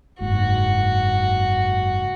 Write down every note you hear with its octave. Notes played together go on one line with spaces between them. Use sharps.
F#1 G#2 F#4